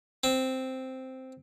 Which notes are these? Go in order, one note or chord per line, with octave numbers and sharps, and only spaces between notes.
C4